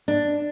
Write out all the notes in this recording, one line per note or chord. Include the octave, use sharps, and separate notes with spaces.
D4